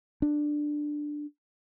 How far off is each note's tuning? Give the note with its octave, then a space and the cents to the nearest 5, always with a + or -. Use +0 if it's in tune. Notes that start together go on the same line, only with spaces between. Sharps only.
D4 +10